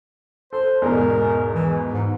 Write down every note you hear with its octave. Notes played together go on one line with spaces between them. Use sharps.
A4 C5
E2 G#2 B2 A#4
E3
G#2